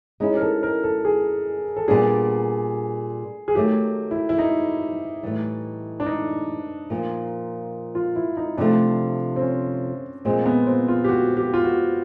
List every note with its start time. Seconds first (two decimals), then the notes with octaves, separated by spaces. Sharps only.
0.20 G#3 C#4 D#4 E4
0.37 A#4
0.41 A4
0.63 A#4
0.83 A4
1.05 G#4
1.77 A4
1.88 A#2 G3 B3 D4 G#4
3.48 G#4
3.55 D#3 F#3 A3 G4
4.11 E4
4.29 E4
4.38 D#4
5.23 A2 E3 G3
6.00 D4
6.06 D#4
6.90 A#2 F3 A#3
7.95 F4
8.16 E4
8.37 D#4
8.57 C3 F3 A3 D4
9.36 C4
9.42 C#4
10.25 A#2 F3 G#3 C4
10.46 B3
10.67 C4
10.88 F4
11.04 G4
11.09 F#4
11.37 G4
11.54 F4
11.64 F#4